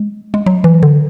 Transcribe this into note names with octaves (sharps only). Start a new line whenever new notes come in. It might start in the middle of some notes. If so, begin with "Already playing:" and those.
Already playing: G#3
G#3
F#3
E3
D3